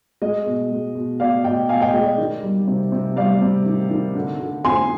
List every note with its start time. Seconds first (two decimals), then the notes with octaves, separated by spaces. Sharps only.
0.22 G#3 D#5
0.46 B2
0.71 G#3
0.95 B2
1.20 B2 D5 F5
1.44 B2 D#5 G5
1.69 B2 F5 G#5
1.81 D#5 G5
1.94 G#3 D#5
2.06 D5
2.18 D#3
2.43 G3
2.67 C3
2.92 C3
3.16 G3 D5 F5
3.41 C3
3.66 D#3
3.91 D#3
4.15 D3
4.40 D3
4.65 F2 G#5 C6